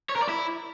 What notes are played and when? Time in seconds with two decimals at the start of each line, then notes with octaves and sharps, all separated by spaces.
0.09 C#5
0.16 A#4
0.22 D5
0.29 E4